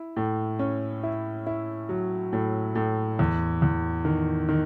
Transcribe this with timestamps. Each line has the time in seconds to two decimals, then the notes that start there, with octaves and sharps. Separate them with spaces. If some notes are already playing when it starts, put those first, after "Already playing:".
Already playing: E4
0.16 A2
0.59 C#4
1.03 E4
1.47 E4
1.89 F#3
2.33 A2
2.75 A2
3.19 E2
3.62 E2
4.05 D#3
4.49 D#3